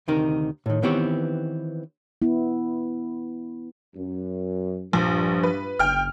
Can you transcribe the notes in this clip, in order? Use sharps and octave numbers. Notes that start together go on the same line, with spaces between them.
D2 C3 D#3 D#4 A#4
A2 D#3
D#3 E3 B3 C4 G4 C#5
B3 E4
F#2
A#1 G2 F3
B4
F#1 G5 F6